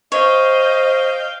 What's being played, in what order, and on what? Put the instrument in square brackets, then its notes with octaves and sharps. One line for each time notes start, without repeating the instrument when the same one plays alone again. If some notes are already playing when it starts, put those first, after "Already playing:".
[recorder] C5 [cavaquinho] C#5 [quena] D#5 [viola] F5 G5